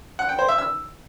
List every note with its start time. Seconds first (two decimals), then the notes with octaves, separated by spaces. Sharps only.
0.19 F#5
0.29 G5
0.39 C5
0.48 E5
0.58 E6